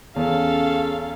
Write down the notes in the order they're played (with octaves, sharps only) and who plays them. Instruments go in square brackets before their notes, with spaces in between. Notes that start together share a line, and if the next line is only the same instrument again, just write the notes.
[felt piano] E2 [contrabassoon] C#3 [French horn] C#4 [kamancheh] A4 F5